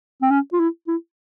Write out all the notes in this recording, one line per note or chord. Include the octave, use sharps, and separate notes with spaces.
C4
C#4
F4
E4
E4